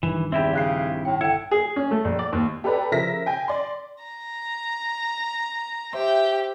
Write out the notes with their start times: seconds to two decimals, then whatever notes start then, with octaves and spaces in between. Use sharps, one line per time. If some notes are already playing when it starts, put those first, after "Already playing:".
0.03 A#1 G2 D#3 E3
0.32 E2 C4 E4 G4 E5 B5
0.53 C#3 F5 F#6 C7
1.05 A2 G5
1.21 D3 E4 G5 C#7
1.51 G#4
1.76 C#4
1.91 A3
2.05 A#1
2.19 D5
2.33 D#2
2.64 G4 A4 B4 D5 A#5
2.91 C#3 F3 A#4 E5 A#6 B6
3.26 G5 G#5
3.48 D5 C6
4.04 A#5
5.93 G4 C5 E5 G5